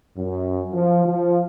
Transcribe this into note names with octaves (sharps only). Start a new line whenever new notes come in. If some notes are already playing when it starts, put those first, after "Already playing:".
F#2
F3
F3